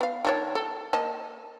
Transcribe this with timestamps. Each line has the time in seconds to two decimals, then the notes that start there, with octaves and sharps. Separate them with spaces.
0.01 B3 F5
0.25 D#3 D4 C#5
0.55 A4
0.93 A#3 D#5 A5